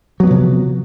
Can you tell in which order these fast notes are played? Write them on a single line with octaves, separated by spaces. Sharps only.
F#3 B3 F3 C3